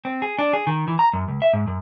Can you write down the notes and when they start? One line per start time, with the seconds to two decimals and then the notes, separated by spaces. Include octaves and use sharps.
0.05 C4
0.22 G#4
0.39 D4
0.53 G#4
0.67 D#3
0.88 E3
0.99 A#5
1.13 F#2
1.28 C#2
1.42 E5
1.53 G#2
1.67 F#2